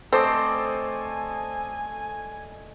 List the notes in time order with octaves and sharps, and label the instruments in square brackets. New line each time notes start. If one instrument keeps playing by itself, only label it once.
[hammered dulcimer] A3 D5 D#5 [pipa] C4 [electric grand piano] A4 C5 [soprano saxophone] G#5